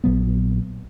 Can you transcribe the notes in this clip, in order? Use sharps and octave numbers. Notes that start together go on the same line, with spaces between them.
A#1 A#2 F#3 B3